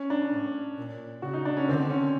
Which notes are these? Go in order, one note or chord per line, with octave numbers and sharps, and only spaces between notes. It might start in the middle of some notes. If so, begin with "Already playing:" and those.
Already playing: C#4
D4
A2
A#2
C#3 F#4
D#4
D4
C#4
D3 C4
C#4